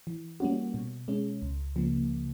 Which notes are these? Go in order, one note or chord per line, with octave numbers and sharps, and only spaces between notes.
E3
G3 A#3 C#4 F#4
B2
G#3 C#4
C#2
C#3 F3 A#3